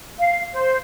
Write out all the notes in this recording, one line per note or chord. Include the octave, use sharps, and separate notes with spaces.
F5
C5